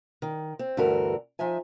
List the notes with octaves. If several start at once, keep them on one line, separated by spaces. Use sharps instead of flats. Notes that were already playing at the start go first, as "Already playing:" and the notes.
D#3
C4
D2 G2 E3 F#4 A4 A#4
F3 D#4 E5 G#5